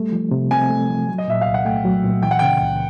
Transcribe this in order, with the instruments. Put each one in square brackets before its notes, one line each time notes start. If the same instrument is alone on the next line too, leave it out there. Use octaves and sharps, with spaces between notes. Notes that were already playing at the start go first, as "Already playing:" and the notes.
Already playing: [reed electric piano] G3 A3
F3
C3
[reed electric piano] C4 [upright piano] G#5
[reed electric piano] A3
F3
F#3
[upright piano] D#5
[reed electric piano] A#2 [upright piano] E5
[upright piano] F5
[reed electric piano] C2
[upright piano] F#5
[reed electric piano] A3 [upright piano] G5
[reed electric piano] F#3
A#2
[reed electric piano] E3 [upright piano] G5
[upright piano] F#5
[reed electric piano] C#3 [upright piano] G5
[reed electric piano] C#2